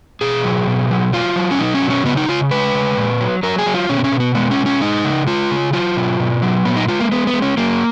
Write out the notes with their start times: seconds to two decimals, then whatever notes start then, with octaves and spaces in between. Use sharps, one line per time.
0.21 B2 G#4
0.44 F#3
0.67 B2
0.91 F#3
1.13 F#3 F4
1.36 F#3
1.51 C#4
1.59 B2 D#4
1.74 C#4
1.82 F#3
1.90 C#4
2.05 C#3 B3
2.17 D#4
2.28 C#3 F4
2.51 G#3 B4
2.74 C#3
2.97 A#2
3.20 F#3
3.43 F#3 A#4
3.58 G#4
3.66 F#3
3.74 F4
3.89 B2 C#4
3.98 B3
4.04 C#4
4.12 B2
4.20 B3
4.35 G#3 B3
4.51 C#4
4.59 B2
4.66 C#4
4.81 G#3 D#4
5.05 C#3
5.27 G#3 F4
5.51 C#3
5.73 F#3 F4
5.97 B2
6.20 B2
6.42 F#3
6.65 A#2 B3
6.77 D#4
6.88 G#3 F4
7.00 A#3
7.12 G#3 B3
7.27 B3
7.34 G#3
7.42 C#4
7.57 F#3 A#3